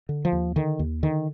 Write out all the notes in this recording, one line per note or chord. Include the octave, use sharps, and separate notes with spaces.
D3
F3
D#2
D3 D#3
D#2
D3 D#3